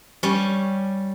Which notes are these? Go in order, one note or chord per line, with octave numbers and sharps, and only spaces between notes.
G3 C#4